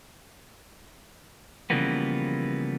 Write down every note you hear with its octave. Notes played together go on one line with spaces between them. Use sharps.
C#3 E3 F3 G3 A#3 B3